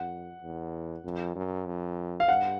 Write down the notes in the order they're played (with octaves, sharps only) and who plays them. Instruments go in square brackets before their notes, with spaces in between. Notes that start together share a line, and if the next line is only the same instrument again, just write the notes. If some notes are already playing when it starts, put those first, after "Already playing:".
Already playing: [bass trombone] F2 [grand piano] F#5
[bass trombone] E2
F2
F#2
F2
[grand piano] F5
[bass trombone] G2 [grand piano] F#5